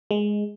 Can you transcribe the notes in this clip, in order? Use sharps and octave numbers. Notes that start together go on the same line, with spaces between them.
G#3